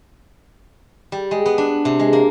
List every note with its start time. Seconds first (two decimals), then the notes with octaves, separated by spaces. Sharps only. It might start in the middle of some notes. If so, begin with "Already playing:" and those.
1.12 G3
1.31 G#3
1.46 B3
1.58 D4
1.85 C3
1.99 G#3
2.13 A#3